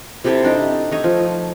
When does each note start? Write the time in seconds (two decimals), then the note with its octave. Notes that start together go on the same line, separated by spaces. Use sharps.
0.24 C3 E4 G4 A4
0.44 D4 D#4 G4
0.91 A3 D#4 C#5
1.04 F3